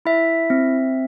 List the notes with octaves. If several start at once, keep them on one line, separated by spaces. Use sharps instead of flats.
E4 E5
C4